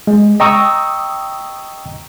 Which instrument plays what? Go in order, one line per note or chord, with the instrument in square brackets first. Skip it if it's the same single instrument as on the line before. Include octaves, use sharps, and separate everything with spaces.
[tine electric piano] G#3
D#5 G5 A#5 C#6 D#6 E6